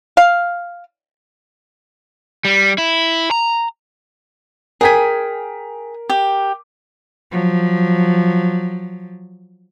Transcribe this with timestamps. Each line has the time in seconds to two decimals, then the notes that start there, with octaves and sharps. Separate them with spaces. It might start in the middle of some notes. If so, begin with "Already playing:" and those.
0.17 F5
2.45 G3
2.78 E4
3.31 A#5
4.81 G#4 A#4 G5 G#5 B6
6.10 G4
7.31 F3 F#3